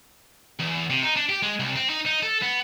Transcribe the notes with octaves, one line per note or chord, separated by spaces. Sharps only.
E2
C3
D#4
D4
G4
G#3
C2
C4
D#4
D#4
A4
B3